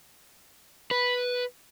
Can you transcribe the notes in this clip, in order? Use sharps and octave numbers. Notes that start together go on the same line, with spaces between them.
B4